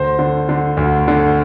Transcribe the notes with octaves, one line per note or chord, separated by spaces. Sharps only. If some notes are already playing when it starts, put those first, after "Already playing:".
Already playing: D2 C5 C6
D3
D3
D2
D3